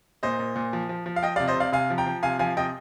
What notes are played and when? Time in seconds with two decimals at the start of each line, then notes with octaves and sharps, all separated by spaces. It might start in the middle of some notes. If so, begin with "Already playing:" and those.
0.23 A#2 C5 D#5
0.39 A#2
0.56 A#2
0.73 F3
0.89 F3
1.06 F3
1.16 F5
1.23 F3 D#5 G5
1.36 D5 F5
1.40 C3
1.48 C5 D#5
1.56 C3 D5 F5
1.72 C3 F5 G#5
1.90 F3
1.98 G5 A#5
2.06 F3
2.23 C3 F5 G#5
2.39 F3 F5 G#5
2.57 C3 D#5 G5